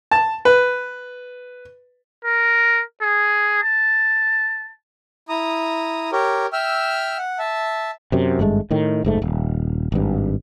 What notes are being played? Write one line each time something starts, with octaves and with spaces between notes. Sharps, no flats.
A5
B4
A#4
G#4
A5
E4 A#5 D#6
G4 A#4 C#5
E5 G5 E6 F6
F#5
E5 A5
F#2 C3
G#1 G2 G#3 A3
A2 D#3
F#1 G#2 A3
D#1
G#1 G2